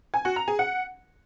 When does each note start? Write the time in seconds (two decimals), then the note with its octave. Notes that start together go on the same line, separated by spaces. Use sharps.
0.14 G#5
0.25 F#4
0.36 A#5
0.48 G#4
0.59 F#5